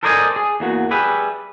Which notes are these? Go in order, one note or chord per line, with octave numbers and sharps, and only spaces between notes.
A4 A#4 C5 D5 D#5 G#5
G#4
E2 A#3 F#4
G3 G#4 B4 E5